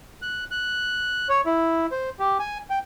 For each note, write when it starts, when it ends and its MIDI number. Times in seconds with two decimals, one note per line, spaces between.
0.22 0.44 90
0.51 1.28 90
1.29 1.41 73
1.46 1.86 64
1.92 2.09 72
2.19 2.38 67
2.40 2.58 80
2.70 2.79 79